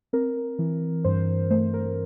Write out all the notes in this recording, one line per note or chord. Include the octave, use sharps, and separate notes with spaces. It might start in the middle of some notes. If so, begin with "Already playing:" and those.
C4 A#4
E3
G2 C5
A3 C5
A#4